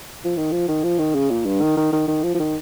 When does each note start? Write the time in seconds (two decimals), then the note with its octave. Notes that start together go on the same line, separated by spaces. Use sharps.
0.25 F3
0.37 D#3
0.51 F3
0.68 D#3
0.83 F3
0.99 D#3
1.14 C#3
1.30 A#2
1.45 G2
1.61 D#3
1.77 D#3
1.92 D#3
2.08 D#3
2.23 F3
2.35 F3
2.39 D#3